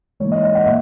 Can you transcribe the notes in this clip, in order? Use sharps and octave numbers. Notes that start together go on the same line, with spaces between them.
G#2 E3 A#3 C#5
D#5
D#5
D#5 F#5
A#2 E5